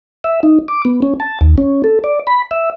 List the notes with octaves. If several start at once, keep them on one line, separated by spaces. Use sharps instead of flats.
E5
D#4
D6
B3
C#4
A5
D#2
C#4
A4
D5
B5
E5